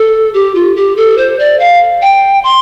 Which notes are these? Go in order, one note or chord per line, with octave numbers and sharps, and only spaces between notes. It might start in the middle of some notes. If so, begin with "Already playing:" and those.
Already playing: A4
G4
F4
G4
A4
C5
D5
F5
G5
C6